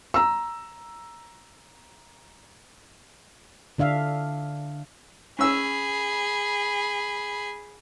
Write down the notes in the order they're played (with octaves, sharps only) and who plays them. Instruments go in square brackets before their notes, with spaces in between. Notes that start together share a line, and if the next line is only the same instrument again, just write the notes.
[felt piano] A#5 E6
[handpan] D3 D4 E5 F5
[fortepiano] C#4 E6 [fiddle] G#4 B5